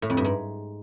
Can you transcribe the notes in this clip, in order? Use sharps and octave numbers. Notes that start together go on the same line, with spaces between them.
A2
F2
G2
G#2